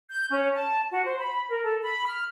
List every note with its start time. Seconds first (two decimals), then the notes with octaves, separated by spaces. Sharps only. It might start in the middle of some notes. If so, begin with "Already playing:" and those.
0.10 G6
0.30 C#4
0.55 A5
0.91 F#4
1.05 C5
1.20 B5
1.49 A#4
1.63 A4
1.82 B5
2.06 F6